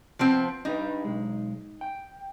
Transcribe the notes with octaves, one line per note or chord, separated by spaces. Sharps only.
F3 B3 C4
D4 D#4 G4 B4
B1 G#3
G5